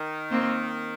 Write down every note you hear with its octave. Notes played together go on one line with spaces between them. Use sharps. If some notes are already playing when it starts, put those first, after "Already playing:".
Already playing: D#3
A#3 C4